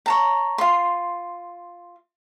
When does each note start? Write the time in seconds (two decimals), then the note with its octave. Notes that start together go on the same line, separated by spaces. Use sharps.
0.06 C#5 A5 A#5
0.58 F4 C6